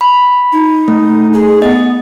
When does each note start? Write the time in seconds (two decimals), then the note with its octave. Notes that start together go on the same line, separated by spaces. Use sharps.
0.01 B5
0.52 D#4
0.88 A3
1.33 G#4
1.62 B3 D#5